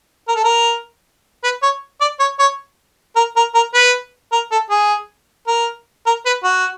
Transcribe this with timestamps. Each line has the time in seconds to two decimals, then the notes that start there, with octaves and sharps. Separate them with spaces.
0.28 A#4
0.36 A4
0.44 A#4
1.43 B4
1.63 C#5
2.01 D5
2.20 C#5
2.39 C#5
3.16 A#4
3.36 A#4
3.55 A#4
3.74 B4
4.32 A#4
4.52 A4
4.70 G#4
5.48 A#4
6.06 A#4
6.26 B4
6.44 F#4